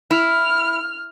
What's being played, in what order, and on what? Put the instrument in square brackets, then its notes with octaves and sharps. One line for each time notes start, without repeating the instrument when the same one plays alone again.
[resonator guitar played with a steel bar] E4 [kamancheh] F6